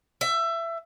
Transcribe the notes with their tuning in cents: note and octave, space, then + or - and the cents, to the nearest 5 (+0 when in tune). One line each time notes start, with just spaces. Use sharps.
E5 +20